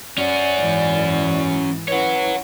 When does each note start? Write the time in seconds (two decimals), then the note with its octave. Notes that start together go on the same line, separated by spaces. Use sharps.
0.18 C#4 F#4 D5
0.58 G#2 E3
1.88 C#4 E4 B4 C#5 F#5